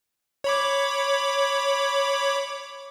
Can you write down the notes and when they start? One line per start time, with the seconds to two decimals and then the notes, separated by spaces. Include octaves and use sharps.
0.44 C#5 B5 D6